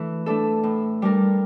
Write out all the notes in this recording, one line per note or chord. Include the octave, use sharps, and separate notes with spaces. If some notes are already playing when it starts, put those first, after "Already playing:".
Already playing: E3 A3 D4 A4
A3 D4 A4
A2
G3 D4 G4 A#4